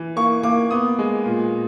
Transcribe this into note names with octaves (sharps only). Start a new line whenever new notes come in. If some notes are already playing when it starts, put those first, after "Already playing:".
Already playing: E3
A#3 C#6
A#3 D6
B3 D#6
G#3
A#2